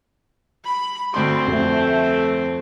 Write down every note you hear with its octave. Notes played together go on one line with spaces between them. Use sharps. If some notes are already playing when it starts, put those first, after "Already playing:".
B5
D2 C4 B5 C6
F2 A3